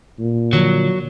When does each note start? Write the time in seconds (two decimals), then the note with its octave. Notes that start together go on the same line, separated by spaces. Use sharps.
0.20 A#2
0.53 D3 F3 F#3